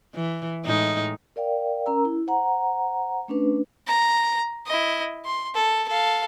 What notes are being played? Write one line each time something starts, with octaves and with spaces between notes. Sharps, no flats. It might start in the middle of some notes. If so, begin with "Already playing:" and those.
E3
A2 G#3 D#4
A#4 D5 F5 G5
C#4 A#4 A#5 E6
E4
C5 F#5 A#5
A3 C#4 D4 B4
A#5
E4 D#5
C6
A4
A4 F5